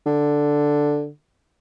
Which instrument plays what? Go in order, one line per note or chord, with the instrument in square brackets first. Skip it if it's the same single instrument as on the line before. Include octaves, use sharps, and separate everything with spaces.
[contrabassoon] D3